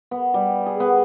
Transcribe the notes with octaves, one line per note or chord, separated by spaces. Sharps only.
B3
G3
G#4
B3